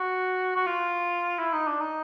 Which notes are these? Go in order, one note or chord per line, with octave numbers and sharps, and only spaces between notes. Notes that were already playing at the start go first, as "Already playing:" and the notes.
Already playing: F#4
F#4
F4
E4
D#4
D4
D#4